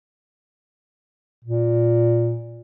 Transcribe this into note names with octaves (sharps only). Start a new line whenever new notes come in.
A#2